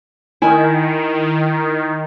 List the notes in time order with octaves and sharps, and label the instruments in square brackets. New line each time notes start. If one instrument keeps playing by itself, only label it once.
[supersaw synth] D#3 [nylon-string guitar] E4 G#5